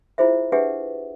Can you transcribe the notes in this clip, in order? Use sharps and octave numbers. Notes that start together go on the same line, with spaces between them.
E4 F4 G#4 C5 E5
D4 G4 G#4 B4 E5 F#5